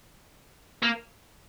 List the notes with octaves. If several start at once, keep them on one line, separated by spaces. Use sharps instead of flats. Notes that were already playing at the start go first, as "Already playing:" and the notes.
A#3